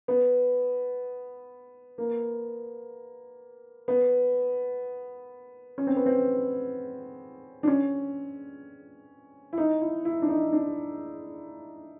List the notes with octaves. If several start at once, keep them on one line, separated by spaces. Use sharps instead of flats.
B3
A#3
B3
C#4
C4
B3
C4
D4
C#4
E4
D#4
E4
E4
D4
D#4
D4